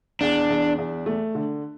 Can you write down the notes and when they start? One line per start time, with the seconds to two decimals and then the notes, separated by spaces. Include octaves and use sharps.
0.21 E2 D4
0.50 E2
0.78 E2
1.06 A3
1.35 D3